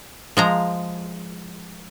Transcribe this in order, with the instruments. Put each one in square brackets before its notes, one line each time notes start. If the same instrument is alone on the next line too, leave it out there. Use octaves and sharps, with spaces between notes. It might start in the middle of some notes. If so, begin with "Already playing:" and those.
[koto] F3 G#3 A#5